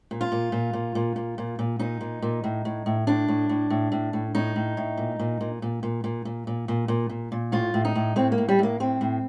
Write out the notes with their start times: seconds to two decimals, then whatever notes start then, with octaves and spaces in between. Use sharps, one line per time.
0.11 A#2
0.21 F4
0.32 A#2
0.52 A#2
0.73 A#2
0.95 A#2
1.16 A#2
1.38 A#2
1.59 A#2
1.79 A#2 D#4
2.01 A#2
2.22 A#2
2.44 A2
2.65 A2
2.86 A2
3.07 A2 D4
3.28 A2
3.49 A2
3.70 A2
3.92 A2
4.13 A2
4.35 A2 D#4
4.56 A2
4.77 A2
4.97 A#2
5.19 A#2
5.41 A#2
5.62 A#2
5.83 A#2
6.04 A#2
6.25 A#2
6.47 A#2
6.68 A#2
6.88 A#2
7.10 A#2
7.32 A#2
7.52 A2 F4
7.74 A2
7.85 D#4
7.95 A2
8.16 A2 C4
8.32 A#3
8.38 A2
8.49 G3
8.59 A2 A#3
8.80 A2 C4
9.01 A2